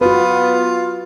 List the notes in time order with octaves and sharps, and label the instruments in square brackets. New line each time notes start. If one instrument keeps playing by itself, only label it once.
[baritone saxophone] B3 [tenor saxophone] F4 [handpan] F#4 B4